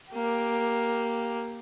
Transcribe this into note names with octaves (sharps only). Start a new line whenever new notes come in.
A#3 G4